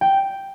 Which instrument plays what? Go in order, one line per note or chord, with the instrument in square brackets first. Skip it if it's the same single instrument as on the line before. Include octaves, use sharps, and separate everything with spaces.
[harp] G5